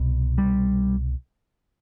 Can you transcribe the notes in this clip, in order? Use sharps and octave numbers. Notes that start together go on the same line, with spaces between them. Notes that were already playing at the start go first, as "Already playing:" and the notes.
Already playing: C2 B2
G3